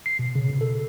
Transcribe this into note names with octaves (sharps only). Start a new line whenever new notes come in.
C7
B2
C#3
B2
A4